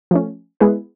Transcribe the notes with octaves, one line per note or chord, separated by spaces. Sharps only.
F3 A3 C#4
G#3 B3 E4 G#4 B4